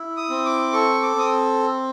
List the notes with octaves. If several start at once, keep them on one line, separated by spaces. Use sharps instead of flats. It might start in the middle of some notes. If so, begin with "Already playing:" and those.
Already playing: E4
D#6
C4
D6
A4 C#6
D6
C4 D#6